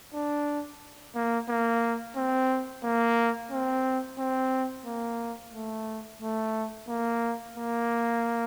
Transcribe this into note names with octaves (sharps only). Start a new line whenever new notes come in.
D4
A#3
A#3
C4
A#3
C4
C4
A#3
A3
A3
A#3
A#3